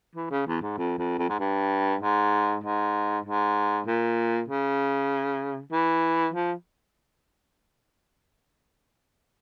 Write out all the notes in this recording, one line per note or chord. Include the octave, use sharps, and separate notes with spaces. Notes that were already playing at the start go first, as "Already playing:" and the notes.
E3
C#3
E2
G#2
F2
F2
F2
G#2
G2
G#2
G#2
G#2
A#2
C#3
E3
F3